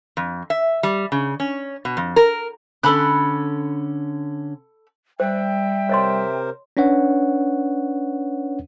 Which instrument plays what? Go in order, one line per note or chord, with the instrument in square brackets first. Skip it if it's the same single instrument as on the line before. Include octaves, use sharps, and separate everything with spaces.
[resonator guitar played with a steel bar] F2
E5
G3
C#3
C#4
B2
F2
A#4
[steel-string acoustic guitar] D3 C#4 [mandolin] A4 B5 F#6
[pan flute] G3 [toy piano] C5 [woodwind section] E5 G5
[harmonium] C3 A#4 C5 [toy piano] C#5 D#5 C6
[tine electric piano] C#4 D4 B4 C#5 F#5